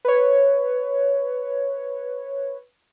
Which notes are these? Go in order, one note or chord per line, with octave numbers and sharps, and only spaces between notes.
B4 C#5